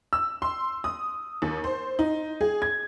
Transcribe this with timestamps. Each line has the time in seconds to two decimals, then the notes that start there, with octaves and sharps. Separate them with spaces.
0.13 E6
0.42 C6
0.84 D#6
1.42 D#2
1.64 C5
1.99 D#4
2.41 G#4
2.62 G#6